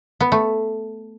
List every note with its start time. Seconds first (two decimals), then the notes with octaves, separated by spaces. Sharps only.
0.20 B3
0.32 A3